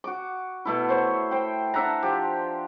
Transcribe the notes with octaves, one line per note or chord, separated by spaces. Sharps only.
F#4 D6
B2 A3 E4
C5 C#5
C5 G5
D4 E5 F#5 A#5
F3 G4